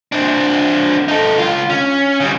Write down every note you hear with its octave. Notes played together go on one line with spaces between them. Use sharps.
C4 D4
D#4 A4
C#2 F4
C#4
C#3 G3